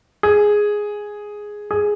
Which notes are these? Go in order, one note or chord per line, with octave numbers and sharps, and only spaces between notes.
G#4
G#4